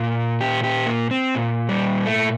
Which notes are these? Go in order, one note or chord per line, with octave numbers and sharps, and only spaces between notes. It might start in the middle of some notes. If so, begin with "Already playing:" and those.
Already playing: A#2
G4
G4
A#3
C4
A#2
G3
A3